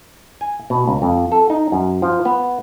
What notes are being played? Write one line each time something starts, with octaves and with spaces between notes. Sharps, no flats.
G#5
B2
C#2
F2
A4
D#4
F#2
F3
B3